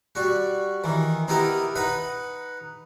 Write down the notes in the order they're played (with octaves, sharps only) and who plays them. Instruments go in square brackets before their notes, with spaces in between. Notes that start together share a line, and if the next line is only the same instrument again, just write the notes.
[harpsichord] G3 F#4
D#3 E3
B3 D#4 E4 G4 A#4 D#5
D#4 B4 D#5 F#5